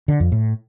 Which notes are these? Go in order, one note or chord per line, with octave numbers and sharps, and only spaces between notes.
D3
F2
A2